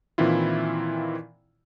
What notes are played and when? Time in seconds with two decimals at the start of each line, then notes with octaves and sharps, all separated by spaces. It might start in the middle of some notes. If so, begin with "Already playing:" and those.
0.18 A#2 D#3 E3 C4 E4 F4